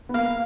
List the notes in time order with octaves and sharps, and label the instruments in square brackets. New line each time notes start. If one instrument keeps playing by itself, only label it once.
[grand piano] B3
[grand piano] A#3 [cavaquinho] F5